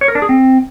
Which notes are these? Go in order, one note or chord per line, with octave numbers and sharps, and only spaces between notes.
C#5
A#4
D4
G#4
C4